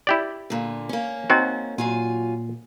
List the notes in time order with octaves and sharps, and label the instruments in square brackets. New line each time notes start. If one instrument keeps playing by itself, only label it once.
[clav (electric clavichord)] E4 G4 D5
[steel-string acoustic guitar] A#2 D3
A#3 C#4
[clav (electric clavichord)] C4 F#4 [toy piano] D#4 D#5 A#5
[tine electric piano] A#2 [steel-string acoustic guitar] F#3 F4 G#5